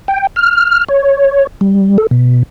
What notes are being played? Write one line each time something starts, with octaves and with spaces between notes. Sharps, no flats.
G5
F6
C#5
G3
A4
B2